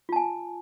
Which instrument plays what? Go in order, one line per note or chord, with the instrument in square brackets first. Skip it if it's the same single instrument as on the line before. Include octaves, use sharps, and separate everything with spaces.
[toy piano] F4
A5
G#5